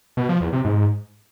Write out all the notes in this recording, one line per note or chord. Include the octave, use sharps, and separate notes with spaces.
B2
F3
E2
C3
G#2